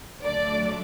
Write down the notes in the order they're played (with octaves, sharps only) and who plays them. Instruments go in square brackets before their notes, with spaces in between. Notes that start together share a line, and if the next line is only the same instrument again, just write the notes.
[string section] D2 D3 F#3 A3 D4 D5